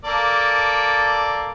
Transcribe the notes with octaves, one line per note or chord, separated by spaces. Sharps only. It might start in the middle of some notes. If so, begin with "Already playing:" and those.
A#3 A4 D5